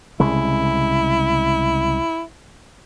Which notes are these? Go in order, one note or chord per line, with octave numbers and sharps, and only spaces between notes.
C2 C#3 G#3 E4